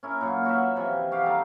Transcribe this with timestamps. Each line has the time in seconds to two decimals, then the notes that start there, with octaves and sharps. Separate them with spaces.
0.03 C#4 E4 A#4
0.21 A#2 F#3
0.45 F#4 A#4 B4 E5
0.76 C3 E3 F3
1.11 F#4 G4 F5
1.26 G3 D#4 A4 F5